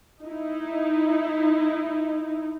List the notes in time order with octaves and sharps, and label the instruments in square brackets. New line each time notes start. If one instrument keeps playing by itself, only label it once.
[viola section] D#4 E4